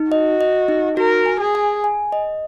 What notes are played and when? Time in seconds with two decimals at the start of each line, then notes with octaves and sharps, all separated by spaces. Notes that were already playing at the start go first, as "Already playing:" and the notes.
Already playing: D#4
0.11 F#4 D#5
0.41 D#5
0.68 D#4
0.97 F#4 A#4
1.26 G#5
1.40 G#4
1.55 G#5
1.84 G#5
2.12 D#5